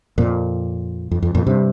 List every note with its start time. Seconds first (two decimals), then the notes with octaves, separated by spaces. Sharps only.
0.18 F2 A#2
1.11 F2
1.22 F2
1.35 F2 A#2
1.47 G2 C3